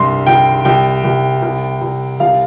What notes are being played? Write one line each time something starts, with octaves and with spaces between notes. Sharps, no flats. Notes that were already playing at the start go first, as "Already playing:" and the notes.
Already playing: C2 G2 C6
C2 G5
C2 G5
C2
C2
C2
C2 F5